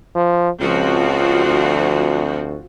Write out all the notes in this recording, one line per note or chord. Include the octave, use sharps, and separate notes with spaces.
F3
C#2 F3 C4 F#4
D2